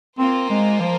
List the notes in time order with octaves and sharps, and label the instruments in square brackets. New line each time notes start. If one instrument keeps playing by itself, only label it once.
[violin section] A#3 F4 C5 [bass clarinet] C4
[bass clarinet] G#3
F3